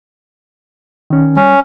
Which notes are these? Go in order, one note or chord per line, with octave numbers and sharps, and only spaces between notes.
D#3 C#4
G3 C#4